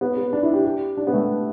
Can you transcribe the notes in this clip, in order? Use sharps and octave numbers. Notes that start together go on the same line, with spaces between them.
B3
B3
D4
E4
G4
G4
D4
B3
A3